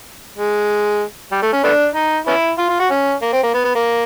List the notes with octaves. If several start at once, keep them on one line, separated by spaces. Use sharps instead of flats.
G#3
G3
A3
C#4
A3 B3 D4
D#4
B3 C#4 E4
F4
F4
F#4
C#4
A#3
C4
A#3
B3
B3
A#3